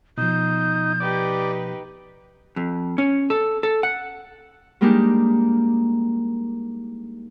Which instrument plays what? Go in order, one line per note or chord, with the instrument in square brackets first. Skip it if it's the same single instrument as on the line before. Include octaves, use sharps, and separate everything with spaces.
[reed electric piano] B2 F3 [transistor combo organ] D#4 [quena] G6
[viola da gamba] D#4 G4 B4 [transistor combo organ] D5
[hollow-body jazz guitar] F2
C#4
A4
A4
F#5
[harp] G3 G#3 A#3 D4 D#4 G4